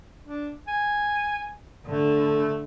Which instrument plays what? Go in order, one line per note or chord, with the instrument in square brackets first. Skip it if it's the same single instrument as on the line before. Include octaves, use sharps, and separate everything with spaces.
[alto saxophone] D4
G#5
[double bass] D3 [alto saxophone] A3